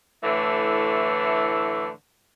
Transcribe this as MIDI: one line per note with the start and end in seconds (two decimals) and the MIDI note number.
0.24 1.89 45
0.24 1.89 50
0.24 1.89 52
0.24 1.89 57